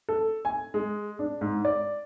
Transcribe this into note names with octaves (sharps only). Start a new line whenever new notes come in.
A4
G#5
G#3
D4
G#2
D5